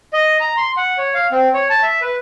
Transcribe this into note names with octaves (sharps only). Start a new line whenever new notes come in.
D#5
A#5
C6
F#5
C#5
F5
C4
C#5
A5
E5
B4